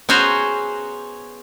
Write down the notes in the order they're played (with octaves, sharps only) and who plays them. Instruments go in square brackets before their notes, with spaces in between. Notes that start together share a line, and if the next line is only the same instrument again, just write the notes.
[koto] B3 C#4 F#4 G#4 C5 A#5